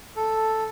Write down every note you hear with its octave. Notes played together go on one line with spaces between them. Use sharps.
A4